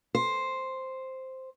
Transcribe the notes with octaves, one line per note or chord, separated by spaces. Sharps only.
C5